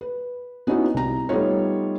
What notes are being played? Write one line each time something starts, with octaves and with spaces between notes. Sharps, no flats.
B4
B3 C#4 D#4 E4 F#4 B4
C2 A#5
G3 A3 B3 D#4 F4 C#5